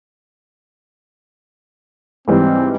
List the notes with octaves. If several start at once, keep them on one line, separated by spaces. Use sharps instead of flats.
G#2 E3 G3 C4